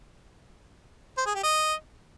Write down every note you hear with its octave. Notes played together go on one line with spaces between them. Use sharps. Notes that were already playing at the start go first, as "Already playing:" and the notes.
C5
G#4
G4
D#5